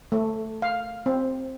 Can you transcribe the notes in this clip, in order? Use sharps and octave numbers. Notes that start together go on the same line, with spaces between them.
A3
F5
C4